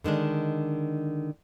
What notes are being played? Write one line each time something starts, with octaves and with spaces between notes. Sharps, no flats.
D3 D#3 G#3 D4